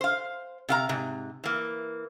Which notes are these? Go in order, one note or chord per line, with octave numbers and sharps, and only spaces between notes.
C5 F5
C3 F5 A#5
G#2 C3
E3 A#3